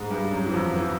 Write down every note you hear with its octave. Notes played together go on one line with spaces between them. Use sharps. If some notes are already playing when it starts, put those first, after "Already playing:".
Already playing: G#2 G#3
G2 G3
F#2 F#3
E3
F2 F3
E3